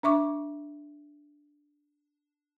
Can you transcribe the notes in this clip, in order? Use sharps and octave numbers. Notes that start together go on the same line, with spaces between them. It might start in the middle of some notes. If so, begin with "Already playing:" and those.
D4 E5 C#6 D6